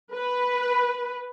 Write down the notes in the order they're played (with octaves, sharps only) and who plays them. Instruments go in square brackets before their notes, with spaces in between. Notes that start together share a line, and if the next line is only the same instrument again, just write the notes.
[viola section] B4